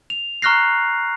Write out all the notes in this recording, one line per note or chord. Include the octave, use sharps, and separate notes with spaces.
F7
A#5 C#6 F6 F#6 A#6 C7